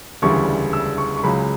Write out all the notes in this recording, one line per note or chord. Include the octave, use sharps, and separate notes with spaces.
E1 D2 C#3 E3 G3 C#6
E6
C#6
C#6
C#2 C#3 F#3 B5